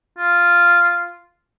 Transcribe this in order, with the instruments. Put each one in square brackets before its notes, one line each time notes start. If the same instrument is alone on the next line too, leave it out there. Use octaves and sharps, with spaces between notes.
[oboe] F4